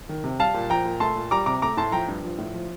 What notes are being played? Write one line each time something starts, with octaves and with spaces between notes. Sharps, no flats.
D#3
C3
G3 F5 A5
A#2
F3 G5 A#5
A#2
A3 A5 C6
A#2
G3 A#5 D6
C3 A#5 D6
A3 A#5 D6
A2 A5 C6
F3 G5 A#5
G2
F3
A2
F3